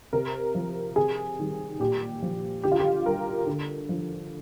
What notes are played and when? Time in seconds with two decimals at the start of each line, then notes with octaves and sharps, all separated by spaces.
0.13 C3 A#4
0.55 F3
0.96 C3 G#4
1.39 D#3 G3
1.80 A#2 G4
2.23 F3
2.64 D3 G4
2.72 F4
2.79 G4
3.05 G3 A#4
3.47 D3
3.89 F3